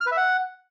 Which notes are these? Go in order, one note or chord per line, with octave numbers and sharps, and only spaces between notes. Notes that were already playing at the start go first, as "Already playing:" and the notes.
F6
B4
E5
F#5